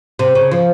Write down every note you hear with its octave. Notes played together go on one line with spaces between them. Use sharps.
C3
C#3
F3